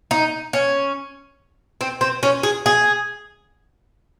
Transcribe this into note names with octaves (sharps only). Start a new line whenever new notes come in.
D#4
C#4
C4
C4
C#4
G#4
G#4